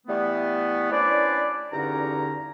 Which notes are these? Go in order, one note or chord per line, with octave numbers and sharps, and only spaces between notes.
E3 G3 A3 B3
C#4 D4 E4 B4 C5 D5
E2 G2 D3 C#4 D#4 A#5